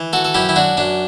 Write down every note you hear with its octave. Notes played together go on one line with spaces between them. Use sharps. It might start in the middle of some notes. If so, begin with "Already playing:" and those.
Already playing: E3
F#4 A4
A4
F#2 E4 G4
E4
D4 F#4
F#2 D4